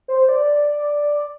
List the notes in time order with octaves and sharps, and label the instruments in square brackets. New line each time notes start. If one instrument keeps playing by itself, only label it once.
[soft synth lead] C5
D5